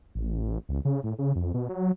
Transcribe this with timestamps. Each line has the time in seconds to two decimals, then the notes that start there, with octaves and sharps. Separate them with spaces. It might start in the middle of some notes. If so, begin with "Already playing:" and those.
0.15 A1
0.69 C#2
0.85 C#3
1.03 A2
1.19 C#3
1.36 F2
1.54 B2
1.69 F#3